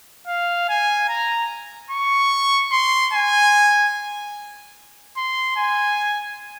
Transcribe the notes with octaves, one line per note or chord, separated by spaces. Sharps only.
F5
G#5
A#5
C#6
C6
G#5
C6
G#5